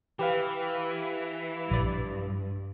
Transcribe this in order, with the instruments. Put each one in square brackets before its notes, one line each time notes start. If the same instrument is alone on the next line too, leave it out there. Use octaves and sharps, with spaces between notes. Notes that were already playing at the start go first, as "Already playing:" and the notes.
[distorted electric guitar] E3 [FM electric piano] G4 B4 F5
[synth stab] A#1 D5 [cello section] G2